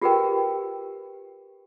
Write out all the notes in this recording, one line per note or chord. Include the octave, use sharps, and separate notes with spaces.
F4 G4 G#4 A#4 B4 G5